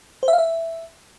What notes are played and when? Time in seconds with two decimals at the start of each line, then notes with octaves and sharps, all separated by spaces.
0.23 C5
0.28 E5
0.33 F5
0.38 E5